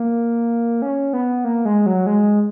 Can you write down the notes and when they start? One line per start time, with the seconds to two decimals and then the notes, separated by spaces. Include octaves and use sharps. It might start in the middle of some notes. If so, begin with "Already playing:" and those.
Already playing: A#3
0.82 C#4
1.13 B3
1.45 A#3
1.65 G#3
1.86 F#3
2.06 G#3